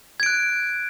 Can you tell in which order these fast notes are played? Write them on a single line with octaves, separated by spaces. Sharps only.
G#6 D7 F#6